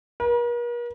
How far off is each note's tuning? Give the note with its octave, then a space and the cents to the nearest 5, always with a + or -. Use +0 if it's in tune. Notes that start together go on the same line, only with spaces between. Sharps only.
A#4 +45